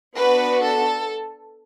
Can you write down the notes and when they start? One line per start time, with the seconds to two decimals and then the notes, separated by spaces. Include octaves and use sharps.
0.16 B3 D4 F#4 B4
0.62 A4